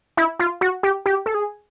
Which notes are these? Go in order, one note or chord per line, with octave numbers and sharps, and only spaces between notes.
E4
F4
F#4
G4
G4
A4
G#4